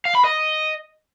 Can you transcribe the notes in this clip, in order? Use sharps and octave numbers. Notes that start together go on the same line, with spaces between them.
F5
B5
D#5